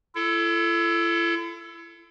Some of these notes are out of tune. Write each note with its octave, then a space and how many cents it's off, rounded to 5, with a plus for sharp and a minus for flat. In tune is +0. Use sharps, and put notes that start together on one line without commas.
E4 +40 A4 +0